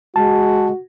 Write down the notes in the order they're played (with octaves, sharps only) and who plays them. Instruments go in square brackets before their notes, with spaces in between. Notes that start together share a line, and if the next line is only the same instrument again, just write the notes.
[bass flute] G#3 [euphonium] F#4 [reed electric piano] A5